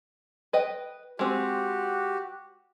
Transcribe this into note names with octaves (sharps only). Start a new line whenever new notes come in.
B4 D#5 G5
G#3 C4 F#4 G4